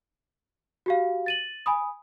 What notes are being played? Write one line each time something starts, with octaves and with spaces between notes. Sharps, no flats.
F#4 G4 F5
A6 D#7 F#7
G#5 B5 D#6